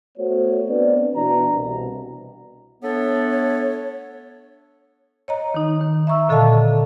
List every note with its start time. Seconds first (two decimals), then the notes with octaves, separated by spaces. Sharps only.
0.18 A3 B3 F#4 C5 C#5
0.68 B3 C4 D4 B4 D5
1.15 B2 E3 D4 A#5
1.51 C2 B2
2.83 A3 B3 D4 A4 C#5
5.28 C#5 D#5 A#5
5.54 D#3 D#4
5.81 D#3
6.07 E5 A#5 C#6 E6
6.29 A#2 D3 A4 D#5 F5 A5